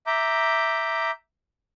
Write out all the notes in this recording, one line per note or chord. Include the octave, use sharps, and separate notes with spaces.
E5 A#5 D6 G6